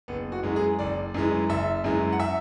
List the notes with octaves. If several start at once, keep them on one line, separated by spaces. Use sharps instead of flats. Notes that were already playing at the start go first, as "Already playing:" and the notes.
F#1 B3
F#4
F#2 E3 G#3
G#4
F#1 D5
F#2 E3 G#3
F#1 E5
F#2 E3 G#3
F#5
E5